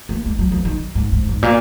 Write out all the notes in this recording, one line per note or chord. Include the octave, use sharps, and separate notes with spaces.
A#3
G#3
F#3
F3
D#3
G#2
G#2
G#2
A#2